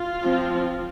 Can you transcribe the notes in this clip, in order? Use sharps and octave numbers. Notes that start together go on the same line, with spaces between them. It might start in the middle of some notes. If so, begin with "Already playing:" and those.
Already playing: F4
F3 C4